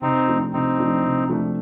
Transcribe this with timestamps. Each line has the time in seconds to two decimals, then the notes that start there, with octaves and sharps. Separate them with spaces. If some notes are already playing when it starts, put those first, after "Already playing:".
0.02 C3 C4 D#4
0.28 F3 A3 D4
0.53 C3 C4 D#4
0.78 F3 A3 D4
1.04 C3
1.30 F3 A3 D4